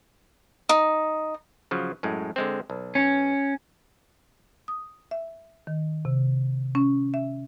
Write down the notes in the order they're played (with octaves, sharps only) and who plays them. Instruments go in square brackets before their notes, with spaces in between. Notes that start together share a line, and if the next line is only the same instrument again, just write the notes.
[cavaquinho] D#4
[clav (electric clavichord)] C#3 F3 F#3
F#2 A2 G#3
D3 G#3 C4
B1
[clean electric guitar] C#4
[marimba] D#6
E5
D#3
C3
C#4
E5